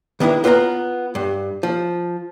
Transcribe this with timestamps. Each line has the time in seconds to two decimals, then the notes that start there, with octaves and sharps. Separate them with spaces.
0.20 D#3 B3 D4 E4
0.44 B3 F4 B4 G5 A#5
1.15 G2
1.63 F3